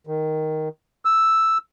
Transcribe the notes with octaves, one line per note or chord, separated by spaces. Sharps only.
D#3
E6